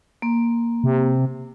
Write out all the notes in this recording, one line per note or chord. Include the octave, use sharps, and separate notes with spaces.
A#3
C3